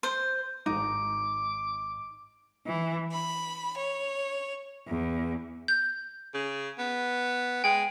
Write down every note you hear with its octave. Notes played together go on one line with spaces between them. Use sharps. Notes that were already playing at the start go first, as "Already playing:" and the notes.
C5
G#1 D#4 D6
E3
B5
C#5
E2
G6
C#3
B3
G#3 G5